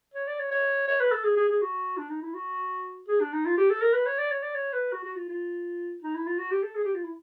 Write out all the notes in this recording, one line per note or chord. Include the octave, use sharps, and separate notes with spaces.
C#5
D5
C#5
C#5
C#5
B4
A4
G#4
G#4
G#4
F#4
D4
D#4
E4
F#4
G#4
D4
D#4
F4
G4
A4
A#4
B4
C#5
D5
C#5
D5
C#5
B4
F#4
F#4
F4
F4
D#4
E4
F4
F#4
G4
A4
G#4
G4
F4
E4